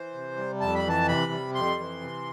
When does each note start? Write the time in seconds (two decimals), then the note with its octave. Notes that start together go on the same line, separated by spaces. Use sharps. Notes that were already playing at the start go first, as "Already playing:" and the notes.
Already playing: E3 C5
0.14 C3
0.37 G3
0.60 F2 A5
0.75 B5
0.85 E3 A5
1.08 C3 B5
1.32 G3
1.55 F2 C6
1.79 E3
2.01 C3